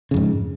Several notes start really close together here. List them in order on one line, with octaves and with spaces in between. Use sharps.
C#3 F2 G#2